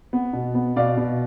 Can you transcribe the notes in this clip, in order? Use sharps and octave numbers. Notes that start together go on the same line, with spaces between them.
B3
B2
B3
B2 D5 F5
B2